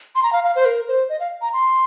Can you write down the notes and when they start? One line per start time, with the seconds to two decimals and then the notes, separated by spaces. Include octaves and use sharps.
0.15 C6
0.23 A#5
0.33 F5
0.44 F5
0.56 C5
0.65 A#4
0.88 C5
1.09 D#5
1.20 F5
1.42 A#5
1.53 C6